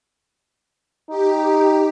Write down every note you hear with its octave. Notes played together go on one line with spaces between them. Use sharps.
D#4 G4